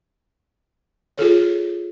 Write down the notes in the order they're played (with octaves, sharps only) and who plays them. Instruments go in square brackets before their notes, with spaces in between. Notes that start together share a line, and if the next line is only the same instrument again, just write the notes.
[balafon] F4 G#4 A4 C#5